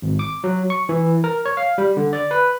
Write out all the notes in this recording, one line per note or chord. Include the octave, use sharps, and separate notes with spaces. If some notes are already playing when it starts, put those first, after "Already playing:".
G#1
D6
F#3
C#6
E3
A#4
C#5
F5
G3
D3
D5
B4